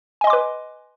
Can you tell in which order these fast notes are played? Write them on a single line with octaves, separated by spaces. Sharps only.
G#5 D#5 C6 D6 B4